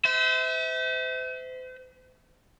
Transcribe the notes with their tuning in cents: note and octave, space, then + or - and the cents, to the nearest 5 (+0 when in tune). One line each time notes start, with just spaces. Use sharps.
C5 -40 E5 -30